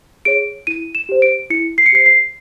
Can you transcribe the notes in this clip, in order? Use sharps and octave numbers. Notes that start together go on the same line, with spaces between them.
G#4 C#5 D7
E4 D#7
E7
G4 C5
D7
E4 C#7
C7
C#7
G4 C5 C7
C7